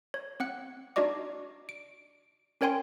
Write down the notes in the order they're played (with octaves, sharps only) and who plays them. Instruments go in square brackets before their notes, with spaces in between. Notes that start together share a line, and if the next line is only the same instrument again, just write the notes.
[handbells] C#5
C4 F#5 F#6
D4 D#4 F#4 D5 D#5 D6
D7
C#4 A#4 C#5 G5 G#5 C6